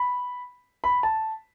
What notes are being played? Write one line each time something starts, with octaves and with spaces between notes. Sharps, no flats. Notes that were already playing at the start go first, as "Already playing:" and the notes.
Already playing: B5
B5
A5